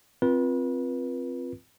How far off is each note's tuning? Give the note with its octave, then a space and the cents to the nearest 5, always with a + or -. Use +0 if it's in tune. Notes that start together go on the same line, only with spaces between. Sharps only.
C4 +0 F4 +0 B4 -35